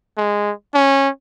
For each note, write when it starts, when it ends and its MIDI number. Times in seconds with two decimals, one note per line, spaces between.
0.17 0.52 56
0.74 1.09 61